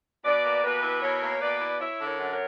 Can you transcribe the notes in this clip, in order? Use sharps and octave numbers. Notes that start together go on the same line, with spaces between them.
B2 B4 D5
A#3
B2 G4 B4
E4
B2 A#4 C#5
A#3
B2 B4 D5
E4
E4 C#5 E5
D3
A#4 C#5
F#2
A#4 C#5